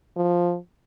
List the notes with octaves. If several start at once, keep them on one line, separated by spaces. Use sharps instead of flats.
F3